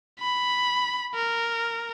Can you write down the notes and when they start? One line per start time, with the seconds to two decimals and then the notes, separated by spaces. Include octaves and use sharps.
0.20 B5
1.15 A#4